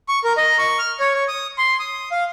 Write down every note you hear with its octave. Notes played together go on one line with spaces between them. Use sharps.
C#6
A#4
D#5
C#6
F6
C#5
C#5
D#6
C6
D#6
F5